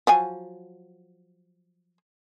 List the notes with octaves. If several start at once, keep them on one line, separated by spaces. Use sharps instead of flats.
F3 F#3 G#5